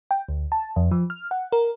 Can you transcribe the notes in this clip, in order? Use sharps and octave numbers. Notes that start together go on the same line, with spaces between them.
G5
D2
A5
F2
F3
F6
F#5
A#4